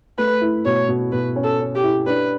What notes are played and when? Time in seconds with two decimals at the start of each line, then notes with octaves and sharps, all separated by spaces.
0.18 A3 B4
0.41 E4
0.65 B2 C#5
0.88 B2
1.12 B2 B4
1.36 C#4
1.44 A4
1.60 C#4
1.75 G4
1.83 E4
2.07 D4 B4